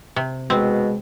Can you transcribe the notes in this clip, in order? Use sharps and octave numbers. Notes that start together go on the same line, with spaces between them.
C3
B2 G#3 C4